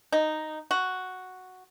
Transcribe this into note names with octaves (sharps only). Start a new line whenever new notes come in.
D#4
F#4